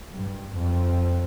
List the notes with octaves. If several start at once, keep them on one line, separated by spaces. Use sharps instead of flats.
G2
F2